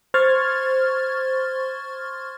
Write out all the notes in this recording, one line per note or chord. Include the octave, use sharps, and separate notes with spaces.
C5 C6 C#6 F6 G#6 A6